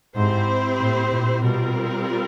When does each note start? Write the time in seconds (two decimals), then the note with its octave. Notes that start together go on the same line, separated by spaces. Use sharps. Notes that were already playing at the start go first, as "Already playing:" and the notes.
0.15 G#2 C4 E4 G4 C5
0.79 A2
1.12 A#2
1.43 B2 G3 C4 F4 A#4